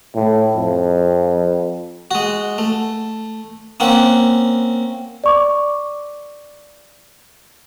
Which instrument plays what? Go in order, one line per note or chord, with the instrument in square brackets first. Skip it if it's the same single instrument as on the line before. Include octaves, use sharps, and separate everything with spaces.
[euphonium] A2
F2
[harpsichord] G#3 F#4
A3
A#3 C4 C#4 F#5
[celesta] D5 C#6 D6